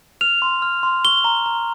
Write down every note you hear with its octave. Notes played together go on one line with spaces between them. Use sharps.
F6 F7
C6
F6
C6
C#6 G7
A#5
A#5